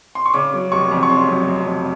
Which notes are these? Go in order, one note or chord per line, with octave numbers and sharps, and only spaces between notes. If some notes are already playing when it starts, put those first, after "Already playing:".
C6
C#6
C#3 D6
F#3
F1 C#6
F2
C#6
C#3 C6
F#3
F1
F2